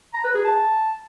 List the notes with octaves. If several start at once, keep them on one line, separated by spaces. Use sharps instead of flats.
A#5
B4
G#4
A5